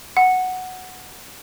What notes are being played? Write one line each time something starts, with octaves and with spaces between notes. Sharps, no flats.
F#5